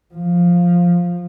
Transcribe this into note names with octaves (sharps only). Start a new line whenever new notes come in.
F3